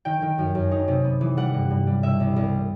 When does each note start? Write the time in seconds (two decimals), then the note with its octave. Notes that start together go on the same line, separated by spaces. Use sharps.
0.05 D#3 G5
0.22 D#3
0.38 F#2
0.55 F#2
0.71 D#4
0.88 C3
1.04 B3
1.21 E3
1.37 G3 F#5
1.54 G2
1.71 G2
1.87 G3
2.03 B2 E5
2.20 C2
2.36 C2